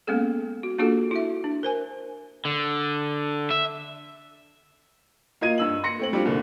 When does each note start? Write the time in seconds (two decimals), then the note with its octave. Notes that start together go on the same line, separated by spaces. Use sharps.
0.07 G#3 A#3 B3 C#4 G#4 A4
0.63 F#4
0.78 A#3 D4 F4 F#4 G#4 A4
1.11 E4 F#4 E5
1.44 D4
1.63 A#4 C5 G#5
2.45 D3
3.50 E5
5.41 A#3 F4 D#5 G#6 D#7
5.58 G2 E6 F#7
5.84 C6 A#6 C#7
5.99 A3 C4 F#7
6.13 G3 D4 F4
6.25 C2 A#2 D3